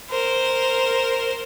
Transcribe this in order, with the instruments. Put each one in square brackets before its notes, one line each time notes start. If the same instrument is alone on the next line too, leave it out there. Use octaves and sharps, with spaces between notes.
[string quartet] A#4 C5